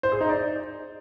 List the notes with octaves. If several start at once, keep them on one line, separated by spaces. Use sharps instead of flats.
C5
G#4
D#4
D5